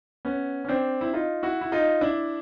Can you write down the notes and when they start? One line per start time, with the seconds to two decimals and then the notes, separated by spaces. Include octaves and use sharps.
0.25 B3 C#4
0.65 C#4
0.68 C4 D4
1.01 E4
1.13 D#4 F4
1.43 E4 F#4
1.61 E4
1.72 D#4 F4
2.01 D4 E4